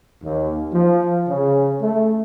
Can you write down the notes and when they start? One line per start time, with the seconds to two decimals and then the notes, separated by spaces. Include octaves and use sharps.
0.24 D#2
0.73 F3
1.28 C#3
1.82 A3